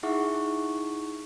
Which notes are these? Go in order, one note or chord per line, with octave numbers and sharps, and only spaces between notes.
D#4 E4 G#4 E5 F#5 C#6